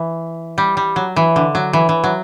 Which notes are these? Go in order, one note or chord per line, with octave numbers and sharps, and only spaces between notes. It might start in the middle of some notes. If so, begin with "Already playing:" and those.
Already playing: E3
G3
G3
F#3
E3
D3
F#3
E3
E3
F#3